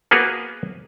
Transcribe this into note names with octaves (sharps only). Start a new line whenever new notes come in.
A#3 B3 F#4 G#4 A#4 B4